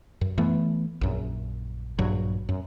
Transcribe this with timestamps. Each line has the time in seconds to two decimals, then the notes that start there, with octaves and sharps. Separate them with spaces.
0.21 F#2
0.38 E3 A3 B3
1.01 A#1 F#2
1.99 A#1 G2 F#3
2.49 F#2